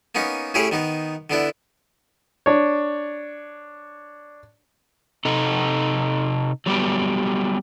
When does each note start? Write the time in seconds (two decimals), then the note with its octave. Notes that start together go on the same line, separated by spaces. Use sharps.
0.15 A#3 B3 C#4 D#4
0.54 A2 C#4 E4 G4 G#4
0.72 D#3 B3 D#4
1.30 D3 B3 D4 E4
2.46 D4 C#5
5.25 C3 D#4 A4
6.66 F#3 G3 B3 G4